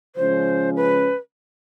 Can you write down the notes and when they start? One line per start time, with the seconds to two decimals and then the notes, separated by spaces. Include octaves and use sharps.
0.16 C#3 F3 G#3 C#4 C5
0.76 B4